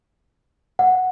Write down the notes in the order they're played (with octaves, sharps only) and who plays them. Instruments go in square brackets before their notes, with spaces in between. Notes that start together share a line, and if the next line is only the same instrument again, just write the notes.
[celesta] F#5